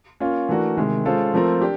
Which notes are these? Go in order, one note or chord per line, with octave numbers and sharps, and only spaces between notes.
A#3 C#4 F4
E3 A3 D4 F#4 A#4
C3 D#3 G#3
G#3 C#4 F4 A4 C5
F3 A3 C4 F4 A#4
D4 G4